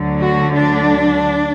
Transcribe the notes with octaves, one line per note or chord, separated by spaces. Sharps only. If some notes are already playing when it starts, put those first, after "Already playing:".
Already playing: D2 D3 F#3
F#4
D4